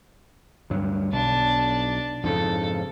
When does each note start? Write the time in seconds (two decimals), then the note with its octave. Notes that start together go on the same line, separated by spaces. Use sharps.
0.70 D2 G2 F#3
1.12 B1 D4 A5
2.23 F2 G#2 C#3 A4